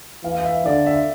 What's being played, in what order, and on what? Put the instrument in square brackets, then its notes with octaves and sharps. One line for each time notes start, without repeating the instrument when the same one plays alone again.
[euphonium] E3 [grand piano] F5
[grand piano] F5
E5
[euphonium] D3 [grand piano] D5
[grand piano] E5